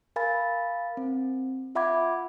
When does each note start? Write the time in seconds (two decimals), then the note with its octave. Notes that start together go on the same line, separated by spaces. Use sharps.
0.16 A#4 F5 G#5 B5 A6
0.97 C4
1.75 F4 E5 F#5 B5 D6 G#6